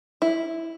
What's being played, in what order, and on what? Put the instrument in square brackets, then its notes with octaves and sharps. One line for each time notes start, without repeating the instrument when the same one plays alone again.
[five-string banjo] E4